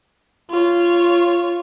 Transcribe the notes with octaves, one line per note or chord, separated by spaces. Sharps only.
F4 C#5